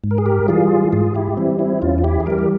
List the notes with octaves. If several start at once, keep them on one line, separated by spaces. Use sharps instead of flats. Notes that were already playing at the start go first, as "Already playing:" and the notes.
G#2
A#4
G#4
G4 A#4
E3 G3 F4 G#4
G#2 F4 G#4
E4 G4
E3 G3 C4 E4
C4 E4
E2 C#4 F4
F4
E4 G4
G#4
E3 G3 G4 A#4
G4